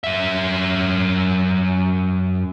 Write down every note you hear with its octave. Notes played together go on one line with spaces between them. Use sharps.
F#2 E5